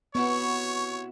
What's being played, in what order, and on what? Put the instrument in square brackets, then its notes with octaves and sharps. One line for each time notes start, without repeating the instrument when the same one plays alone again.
[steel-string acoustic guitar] C3 E4 F#4 [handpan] B3 [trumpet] C#5 [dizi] C#6